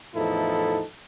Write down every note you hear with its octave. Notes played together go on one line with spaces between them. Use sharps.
E2 A2 F3 D#4 E4 A4